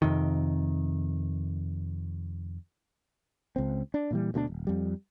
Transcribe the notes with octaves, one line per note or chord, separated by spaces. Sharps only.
F2 C3 D#3
C#2 C4
D4
A#2 E3 G3
D2 B2 G#3 D4
D#1
F2 G3